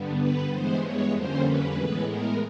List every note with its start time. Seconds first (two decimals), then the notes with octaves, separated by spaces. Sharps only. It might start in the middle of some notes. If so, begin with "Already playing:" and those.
Already playing: G2 D3 G3 B3
0.19 B4
0.50 G2 E3 G#3 B3 C5
0.82 C#5
1.13 F2 D3 G3 A#3 C#4 C5
1.45 B4
1.77 A2 E3 G#3 B3
2.08 A#4